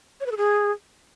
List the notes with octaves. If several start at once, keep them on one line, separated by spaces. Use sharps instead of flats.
C#5
B4
A4
G#4